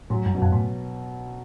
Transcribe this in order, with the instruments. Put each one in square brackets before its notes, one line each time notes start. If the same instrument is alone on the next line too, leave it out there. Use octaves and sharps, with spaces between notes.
[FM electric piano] A2 [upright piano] F#3
[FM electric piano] G2
[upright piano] B2
[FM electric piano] F#2
A2